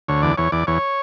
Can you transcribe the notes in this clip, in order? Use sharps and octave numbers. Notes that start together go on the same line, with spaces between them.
D2 C#5
E2 D5
E2 C#5
E2 D5
E2 C#5